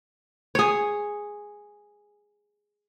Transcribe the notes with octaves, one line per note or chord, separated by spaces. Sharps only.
G#4 C#5